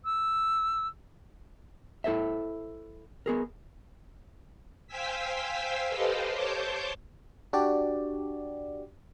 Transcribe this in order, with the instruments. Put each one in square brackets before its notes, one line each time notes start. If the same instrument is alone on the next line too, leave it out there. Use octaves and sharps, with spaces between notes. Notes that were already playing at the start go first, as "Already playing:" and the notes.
[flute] E6
[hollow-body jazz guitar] E4 A4 C5 E5
B3 G#4 A#4
[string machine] C5 F5 G5 G#5 E6 B6
G4 A4 B4 C5 D#5 F5
C5 C#5 A5 D6 G6
[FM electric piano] D4 F#4 G4 D5